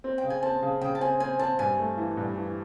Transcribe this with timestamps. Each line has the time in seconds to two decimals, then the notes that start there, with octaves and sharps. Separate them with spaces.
0.04 C4
0.18 G5
0.23 C#3
0.30 G#5
0.43 C4 A5
0.62 C#3
0.81 C#3 G5
0.95 A5
1.01 C4 G#5
1.20 C4 G#5
1.39 C4 A5
1.59 G2 G#5
1.78 A3
1.98 E3
2.17 G2
2.36 E3